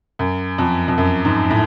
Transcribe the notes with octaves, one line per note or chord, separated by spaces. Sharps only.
F#2
F2
F2
F#2
G#2
A2